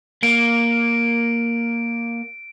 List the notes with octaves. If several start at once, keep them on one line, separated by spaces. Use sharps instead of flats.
A#3 D7